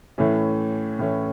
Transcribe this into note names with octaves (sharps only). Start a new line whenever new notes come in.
A2 E3 A3 C#4
A2 E3 A3 C#4